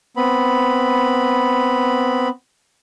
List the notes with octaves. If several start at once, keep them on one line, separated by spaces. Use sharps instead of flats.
B3 C4 B5